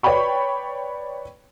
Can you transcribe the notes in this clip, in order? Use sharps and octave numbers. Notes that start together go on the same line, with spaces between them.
B4 C#5 D5 G5 B5 C#6